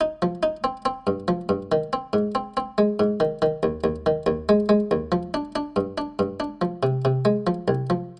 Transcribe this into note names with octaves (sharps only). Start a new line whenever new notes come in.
D#4
F3
D#4
C4
C4
G2
F3
G2
D#3
C4
G#2
C4
C4
G#3
G#2
D#3
D#3
D#2
D#2
D#3
D#2
G#3
G#3
D#2
F3
D4
D4
G2
D4
G2
D4
F3
C3
C3
G#3
F3
C2
F3